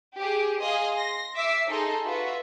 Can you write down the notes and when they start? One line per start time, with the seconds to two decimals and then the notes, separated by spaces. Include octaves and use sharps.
0.16 G4 G#4
0.59 G#4 D#5 F5 C6 D#6
0.94 C6 A#6
1.35 E5 D6 E6 B6 C7
1.67 D#4 G#4 A4 D#5 C6
2.05 F4 F#4 B4 E5